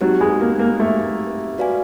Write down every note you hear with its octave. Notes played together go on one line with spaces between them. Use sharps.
F#3 C4 D#4 G4
G#3
A#3
A#3
A3
F#4 B4 D5 F5 G#5